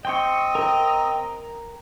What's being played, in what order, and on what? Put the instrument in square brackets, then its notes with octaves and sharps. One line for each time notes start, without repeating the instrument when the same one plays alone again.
[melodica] C4 [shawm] D#5 [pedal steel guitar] G5 C6 C#6
[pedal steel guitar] A#4 G5 A#5